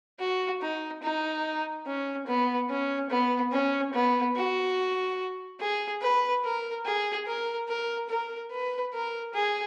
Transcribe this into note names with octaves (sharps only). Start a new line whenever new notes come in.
F#4
D#4
D#4
C#4
B3
C#4
B3
C#4
B3
F#4
G#4
B4
A#4
G#4
A#4
A#4
A#4
B4
A#4
G#4